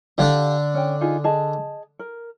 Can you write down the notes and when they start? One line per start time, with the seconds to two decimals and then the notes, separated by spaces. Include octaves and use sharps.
0.18 D3 D4 G4 D5 F5
0.74 C#4 G5
1.01 D#4 F4 G#4
1.24 G#4 D#5 A5
1.99 A#4